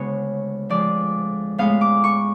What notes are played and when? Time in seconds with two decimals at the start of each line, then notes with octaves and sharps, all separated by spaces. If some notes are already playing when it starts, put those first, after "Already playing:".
Already playing: D2 C#3 G#3 B3 C#5
0.70 F2 F3 G#3 D5
1.58 A2 G#3 B3 F5
1.81 D6
2.04 C#6